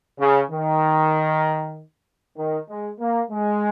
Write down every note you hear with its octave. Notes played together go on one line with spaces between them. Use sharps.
C#3
D#3
D#3
G#3
A#3
G#3